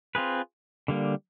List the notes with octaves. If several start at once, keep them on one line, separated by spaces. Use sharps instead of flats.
C4 F4 G#4 B4
D3 G3 A#3